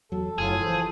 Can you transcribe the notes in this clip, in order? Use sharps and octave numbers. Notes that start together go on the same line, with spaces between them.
E2 F#3 A4
F#1 A2 F#3 F4 G#4
E3 F3 A4 C5